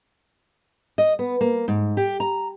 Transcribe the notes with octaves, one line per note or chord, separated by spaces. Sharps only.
D#5
B3
A#3
G#2
G4
A#5